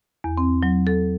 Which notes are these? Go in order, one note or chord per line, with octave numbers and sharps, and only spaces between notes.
E2
C4
F#3
A4